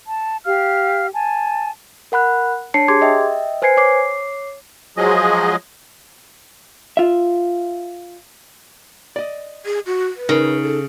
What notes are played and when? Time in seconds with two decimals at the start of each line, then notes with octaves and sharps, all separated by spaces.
0.07 A5
0.46 G4 F5 F6
1.13 G#5 A5
2.12 A#4 F#5 B5 F#6
2.74 D4 C#5 A5 C7 C#7
2.88 G4 G#4 C6 D6 G#6
3.01 D#5 E5 G5
3.62 B4 C5 G#5 G#6 C7 C#7
3.77 C#5 D6 C7
4.97 F3 F#3 G#3 G#4 D#5
6.97 F4 E5
9.16 D5 D#5
9.66 G#4
9.86 F#4
10.16 B4
10.29 C#3 D#4 A#4
10.62 A4